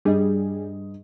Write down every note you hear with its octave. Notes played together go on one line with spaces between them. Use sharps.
G2 G3 G#4 D#5